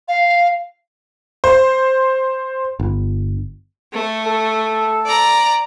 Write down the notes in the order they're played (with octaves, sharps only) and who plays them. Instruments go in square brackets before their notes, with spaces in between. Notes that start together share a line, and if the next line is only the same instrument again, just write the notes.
[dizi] F5
[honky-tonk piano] C5
[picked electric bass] G1
[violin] A3
[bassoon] A4
[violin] D5 A#5